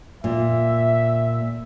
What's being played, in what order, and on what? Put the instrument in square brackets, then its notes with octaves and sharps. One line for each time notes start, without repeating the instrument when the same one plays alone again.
[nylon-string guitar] A#2 [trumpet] E5